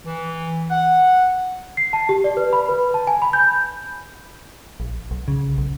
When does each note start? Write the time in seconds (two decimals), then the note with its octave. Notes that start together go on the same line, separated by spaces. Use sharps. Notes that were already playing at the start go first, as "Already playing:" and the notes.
0.05 E3
0.71 F#5
1.77 C7
1.93 A5
2.09 G4
2.24 D5
2.37 B4
2.53 B5
2.69 B4
2.94 A5
3.07 G#5
3.22 B5
3.33 G6
4.80 A#1
5.11 B1
5.28 C#3
5.58 B1